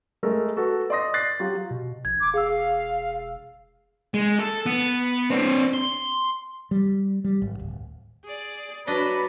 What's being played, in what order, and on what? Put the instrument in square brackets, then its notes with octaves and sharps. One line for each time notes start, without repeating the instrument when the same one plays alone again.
[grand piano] G#3 A3 A4 A#4
F#4 A4 B4
D5 D#5 C6 D#6 A#6
F#6 A6 A#6 C7
F#3 F4 G4
[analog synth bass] B2
[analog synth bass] A#1 [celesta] G#6
[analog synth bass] E1 [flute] D6
[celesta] G#4 E6 [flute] F5
[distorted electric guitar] G#3
A4
B3
C4 D4
C6
[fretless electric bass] G3
G3
G#1
D1
[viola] G#4 D5
[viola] F#3 F#4 [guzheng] D4 D#5 [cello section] B4